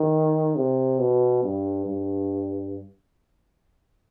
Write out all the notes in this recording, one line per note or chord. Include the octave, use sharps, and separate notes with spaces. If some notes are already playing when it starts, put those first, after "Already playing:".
Already playing: D#3
C3
B2
G2
G2